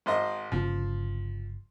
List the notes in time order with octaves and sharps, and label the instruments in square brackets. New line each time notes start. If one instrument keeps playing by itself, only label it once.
[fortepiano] G#1 C5 D#5
[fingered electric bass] G1 C#3 A#3 [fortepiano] F3